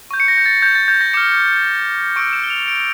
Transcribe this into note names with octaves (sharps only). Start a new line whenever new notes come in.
C#6 G6
C#7
A#6
G6
A6
G6
A6
G6
A#6
D6 F6 C#7
C#6 E6 G6 D7
E7
G7
F7
D7